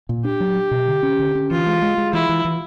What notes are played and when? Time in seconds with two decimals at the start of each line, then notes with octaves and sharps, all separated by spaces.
0.09 A#2
0.24 D4 G4
0.40 F#3
0.56 D4
0.71 B2
0.88 D3
1.03 C#4
1.19 D3
1.35 C#4
1.50 E3 F4
1.66 G#3
1.82 G#3
1.98 G#3
2.13 E3 E4
2.29 E3
2.45 E3